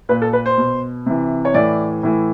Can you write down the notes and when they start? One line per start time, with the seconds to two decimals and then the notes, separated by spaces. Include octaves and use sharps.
0.09 A#2 B4
0.22 A4
0.33 B4
0.46 C5
0.58 B2
1.06 C3 E3
1.45 C#5
1.54 A2 E3 D5
2.03 A2 E3